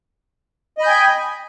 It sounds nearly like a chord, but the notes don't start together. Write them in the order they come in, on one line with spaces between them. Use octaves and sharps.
D#5 B5 G6 G#5 G5